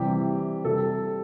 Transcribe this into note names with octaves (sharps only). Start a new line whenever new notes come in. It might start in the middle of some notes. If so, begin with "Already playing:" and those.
Already playing: C3 E3 G3 G4
C3 G3 A4